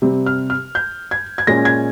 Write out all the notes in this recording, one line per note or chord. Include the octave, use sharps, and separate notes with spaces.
C3 G3 C4
F6
F6
G6
G#6
G#6
A#2 G#3 C#4 A#6
G#6